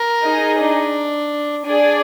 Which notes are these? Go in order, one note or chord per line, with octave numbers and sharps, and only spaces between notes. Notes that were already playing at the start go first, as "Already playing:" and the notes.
Already playing: A#4
D#4 G#4 D#5
D4
D4 G#4 D5 G#5